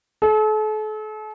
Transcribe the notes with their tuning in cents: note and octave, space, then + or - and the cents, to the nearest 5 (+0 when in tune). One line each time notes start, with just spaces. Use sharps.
A4 -40